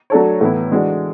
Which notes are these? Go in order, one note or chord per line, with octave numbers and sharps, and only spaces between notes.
F#3 A3 D4 A4 C#5
A2 E3 B3 E4
E3 G#3 D4 F#4